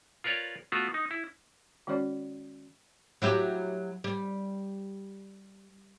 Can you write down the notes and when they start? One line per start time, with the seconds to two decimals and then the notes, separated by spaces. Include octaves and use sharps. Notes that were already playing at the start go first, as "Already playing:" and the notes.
0.24 F4 A#4 B4 C#5 D5
0.72 A3 B3 F4 F#4
0.94 D#4
1.11 E4
1.87 D#3 G#3 C#4 F#4 C#5 D5
3.22 F#3 E4 G4
4.04 G3